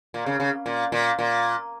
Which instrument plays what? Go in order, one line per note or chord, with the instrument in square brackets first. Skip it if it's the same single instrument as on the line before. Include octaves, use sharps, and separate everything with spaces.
[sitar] A#2
C#3
C#3
A#2
A#2
A#2